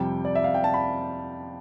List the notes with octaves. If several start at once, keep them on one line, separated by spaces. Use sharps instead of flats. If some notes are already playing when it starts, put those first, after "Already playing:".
Already playing: F2 C3 G3 G5
D5
E5
F5
G5
A5
B5